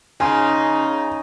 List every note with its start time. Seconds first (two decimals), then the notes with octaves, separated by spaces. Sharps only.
0.20 C#3 D#4 G#5 C6